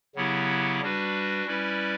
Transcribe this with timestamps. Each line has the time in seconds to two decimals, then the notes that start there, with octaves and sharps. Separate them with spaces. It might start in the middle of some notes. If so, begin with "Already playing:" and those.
0.15 C#3 F#3 B3 E4 G4
0.81 G3 D4 F#4 B4
1.46 G3 C#4 E4 B4 D5